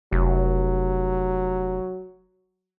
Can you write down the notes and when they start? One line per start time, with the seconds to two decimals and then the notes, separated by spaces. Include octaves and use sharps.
0.12 F1 F#3